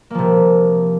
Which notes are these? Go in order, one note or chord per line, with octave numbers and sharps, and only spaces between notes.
C3 F3 A#3